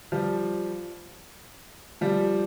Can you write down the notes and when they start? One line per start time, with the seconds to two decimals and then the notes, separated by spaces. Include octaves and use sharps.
0.12 F3 G3
2.01 F3 G3